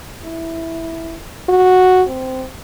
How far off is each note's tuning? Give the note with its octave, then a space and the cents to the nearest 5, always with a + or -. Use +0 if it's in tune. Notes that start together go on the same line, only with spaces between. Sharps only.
E4 -5
F#4 -5
C4 -10